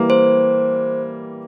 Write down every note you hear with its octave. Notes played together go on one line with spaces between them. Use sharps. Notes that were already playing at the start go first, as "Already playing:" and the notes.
Already playing: E3 G3 A#3
C5